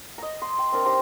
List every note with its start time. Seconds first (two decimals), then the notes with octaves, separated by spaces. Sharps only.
0.18 D#5 A#5
0.42 C6
0.58 G5
0.72 C4 D4 A#4
0.85 D#4 G4 C5 A#5